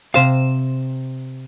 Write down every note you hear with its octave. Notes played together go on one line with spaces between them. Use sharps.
C3 C5 F5